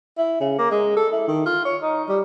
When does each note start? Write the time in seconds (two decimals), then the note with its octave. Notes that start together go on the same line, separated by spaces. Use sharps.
0.18 E4
0.40 C#3
0.58 A#3
0.71 G#3
0.97 A4
1.12 E4
1.28 D#3
1.46 F4
1.65 C#5
1.82 D#4
2.09 G3